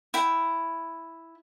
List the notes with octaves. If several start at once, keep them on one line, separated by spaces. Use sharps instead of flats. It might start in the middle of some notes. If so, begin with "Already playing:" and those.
E4 G5